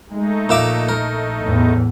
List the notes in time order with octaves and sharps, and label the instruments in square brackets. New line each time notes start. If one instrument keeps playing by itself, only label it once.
[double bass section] G#3 [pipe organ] A3 D#4
[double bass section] A#1 [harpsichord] A#2 E5 D6
[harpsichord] A#4
[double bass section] E2 A2